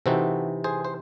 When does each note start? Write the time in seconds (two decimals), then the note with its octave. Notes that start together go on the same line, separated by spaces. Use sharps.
0.06 C3 E3 C4 D#4 F#4 A4
0.64 G#4 C5
0.85 C5